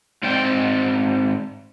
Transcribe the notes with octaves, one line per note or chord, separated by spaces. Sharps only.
G#2 C4 D5 G5